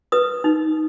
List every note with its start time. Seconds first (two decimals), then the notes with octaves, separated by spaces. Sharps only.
0.12 B4 D#6
0.44 D#4